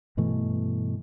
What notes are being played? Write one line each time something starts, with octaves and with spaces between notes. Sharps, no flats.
G2 B2 E3 A3